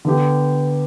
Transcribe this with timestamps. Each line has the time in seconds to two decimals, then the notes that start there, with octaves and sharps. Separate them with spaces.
0.05 D3 B3 G4